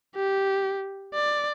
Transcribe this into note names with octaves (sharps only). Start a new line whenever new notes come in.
G4
D5